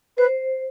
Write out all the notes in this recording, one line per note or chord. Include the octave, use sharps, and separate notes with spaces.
B4 C5